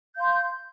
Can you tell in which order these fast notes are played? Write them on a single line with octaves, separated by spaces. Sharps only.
G6 F5 C6